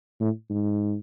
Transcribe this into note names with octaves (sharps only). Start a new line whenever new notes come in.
A2
G#2